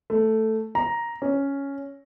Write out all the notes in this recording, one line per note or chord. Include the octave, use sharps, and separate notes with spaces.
A3
A#5
C#4